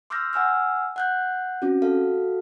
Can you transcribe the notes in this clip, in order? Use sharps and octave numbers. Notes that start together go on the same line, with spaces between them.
C6 D6 E6 F6 G6 A#6
F#5 G#5 E6 F6
F#5 F#6 G6
C4 C#4 F#4
F#4 A4 F5